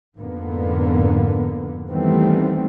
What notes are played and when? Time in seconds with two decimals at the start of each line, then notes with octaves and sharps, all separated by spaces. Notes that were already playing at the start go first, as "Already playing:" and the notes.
0.17 F2 G#2 D3 A#3 B3
1.90 D#3 E3 G3 A3 B3 C4